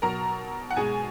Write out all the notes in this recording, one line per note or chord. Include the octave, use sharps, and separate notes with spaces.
B2 F#3 A#4 A#5
F#5
B2 G#3 G#4 G#5